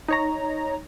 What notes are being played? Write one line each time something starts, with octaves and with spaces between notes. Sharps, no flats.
D#4 C#5 A#5